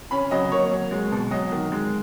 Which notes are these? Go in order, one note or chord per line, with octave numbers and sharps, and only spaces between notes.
C#4 B5
F#3 D#5
A#3 C#5
F#3
G#3
B2
F#3 D#5
D#3
G#3